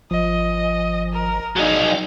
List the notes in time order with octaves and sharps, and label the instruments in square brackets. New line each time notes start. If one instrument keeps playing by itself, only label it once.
[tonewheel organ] G#1 [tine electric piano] F3 [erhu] D#5
[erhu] A#4
[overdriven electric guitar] F#3 D#4 [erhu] G#4 [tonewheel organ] D5 F5 G5